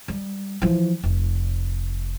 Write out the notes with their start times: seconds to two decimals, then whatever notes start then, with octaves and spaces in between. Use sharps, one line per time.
0.08 G3
0.62 E3 F3
1.03 F1